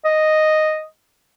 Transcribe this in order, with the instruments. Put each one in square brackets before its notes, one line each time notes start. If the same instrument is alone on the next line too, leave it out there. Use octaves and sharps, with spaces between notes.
[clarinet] D#5